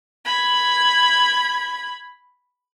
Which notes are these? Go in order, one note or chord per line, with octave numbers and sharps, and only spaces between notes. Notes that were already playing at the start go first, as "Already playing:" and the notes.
B5 G#6